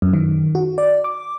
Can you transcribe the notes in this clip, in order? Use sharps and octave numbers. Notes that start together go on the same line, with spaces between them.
F#2
D#3
F#4
D5
D6